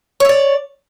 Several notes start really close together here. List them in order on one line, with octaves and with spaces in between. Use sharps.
C#5 E5 D5